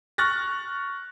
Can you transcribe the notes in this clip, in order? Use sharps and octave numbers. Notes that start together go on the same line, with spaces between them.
C#6 F6 F#6 A6 A#6